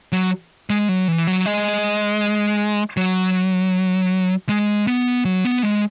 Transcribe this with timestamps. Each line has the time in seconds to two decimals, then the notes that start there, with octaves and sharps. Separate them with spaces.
0.12 F#3
0.70 G#3
0.89 F#3
1.08 E3
1.27 F#3
1.46 G#3
2.97 F#3
4.49 G#3
4.87 B3
5.25 F#3
5.45 B3
5.63 G#3